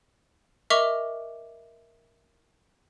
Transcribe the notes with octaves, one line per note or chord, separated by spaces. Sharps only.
A#4 D#5 E5 C#6 D6 F7